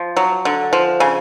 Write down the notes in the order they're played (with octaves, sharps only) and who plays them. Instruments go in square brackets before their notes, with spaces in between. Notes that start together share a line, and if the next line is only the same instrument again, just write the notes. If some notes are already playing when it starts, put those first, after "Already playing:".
Already playing: [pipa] F3
F#3
D3
F3
C#3